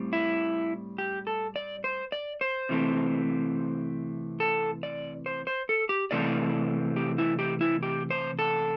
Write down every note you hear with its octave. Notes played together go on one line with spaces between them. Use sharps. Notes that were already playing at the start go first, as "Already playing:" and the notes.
Already playing: A2 G3 C4
E4
G4
A4
D5
C5
D5
C5
C3 E3 A3 C4
A4
D5
C5
C5
A4
G4
C3 E3 A3 C4 D5
G4
E4
G4
E4
G4
C5
A4